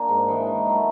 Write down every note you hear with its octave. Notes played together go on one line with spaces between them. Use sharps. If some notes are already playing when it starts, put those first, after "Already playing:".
Already playing: A#3 D4
G#2
E3 G#3
D#3
F#3 A3